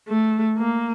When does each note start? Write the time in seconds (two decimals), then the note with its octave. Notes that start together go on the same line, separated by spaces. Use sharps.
0.08 A3
0.57 A#3